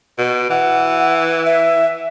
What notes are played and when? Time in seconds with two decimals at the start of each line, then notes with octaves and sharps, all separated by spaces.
0.18 B2
0.50 E3 F#5
1.46 E5